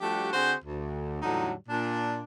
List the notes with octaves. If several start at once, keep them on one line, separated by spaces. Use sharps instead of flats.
F3 G3 A3 D4 F#4 G4
D3 C4 F#4 G#4 C5
D2
E2 A2 D3 F#3 G3 D#4
A#2 D4